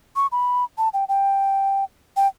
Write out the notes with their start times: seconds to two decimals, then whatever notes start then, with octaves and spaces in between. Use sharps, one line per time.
0.16 C#6
0.32 B5
0.78 A5
0.94 G5
1.09 G5
2.17 G5